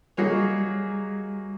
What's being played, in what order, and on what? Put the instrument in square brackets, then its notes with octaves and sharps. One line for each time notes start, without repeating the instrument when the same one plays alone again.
[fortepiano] F#3 A#3 D#4 G#4 C#5 [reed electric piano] G3